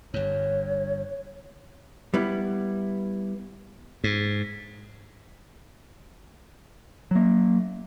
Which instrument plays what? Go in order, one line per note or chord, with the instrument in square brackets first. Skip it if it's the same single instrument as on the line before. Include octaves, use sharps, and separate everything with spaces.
[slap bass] G1 G2 [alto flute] C#5
[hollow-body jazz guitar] G3 B3 E4
[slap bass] G#2
[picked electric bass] F#3 A#3